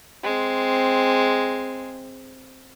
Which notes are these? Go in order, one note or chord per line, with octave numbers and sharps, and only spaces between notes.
G#3 C4